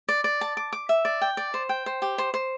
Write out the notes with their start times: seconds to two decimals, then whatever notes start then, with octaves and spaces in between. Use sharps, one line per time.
0.09 D5
0.24 D5
0.41 A5
0.57 D6
0.73 D6
0.89 E5
1.05 D5
1.21 G5
1.37 D5
1.54 C5
1.69 G5
1.86 C5
2.02 G4
2.18 C5
2.34 C5